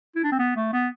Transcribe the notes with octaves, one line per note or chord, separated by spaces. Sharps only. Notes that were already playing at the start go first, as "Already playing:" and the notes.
E4
D4
C4
B3
A3
B3